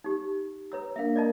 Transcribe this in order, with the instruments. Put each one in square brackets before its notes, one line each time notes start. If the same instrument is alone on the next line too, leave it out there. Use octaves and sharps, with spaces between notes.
[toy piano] D#4 G4
[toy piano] B4 C#5 E6 [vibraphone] A#5
[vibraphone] A#3 D4 A#4 [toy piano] E5 F5
[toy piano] D5 D#5 A5